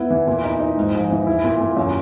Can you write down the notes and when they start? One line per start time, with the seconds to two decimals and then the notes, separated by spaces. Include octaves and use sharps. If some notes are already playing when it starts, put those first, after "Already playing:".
Already playing: B3 E4
0.11 E3
0.27 A#2
0.44 D#4
0.60 D#4
0.78 G#2
0.94 A#1
1.11 E3
1.27 E4
1.44 A#2
1.60 A#2
1.77 F#2